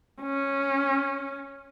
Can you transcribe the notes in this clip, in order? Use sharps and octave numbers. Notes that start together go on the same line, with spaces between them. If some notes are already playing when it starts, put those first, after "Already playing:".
C#4